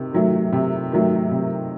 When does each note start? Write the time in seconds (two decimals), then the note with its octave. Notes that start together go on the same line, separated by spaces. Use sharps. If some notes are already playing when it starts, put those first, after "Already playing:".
Already playing: C3 D#3
0.13 D#3 F#3 A3
0.53 C3
0.92 D#3 F#3 A3
1.31 C3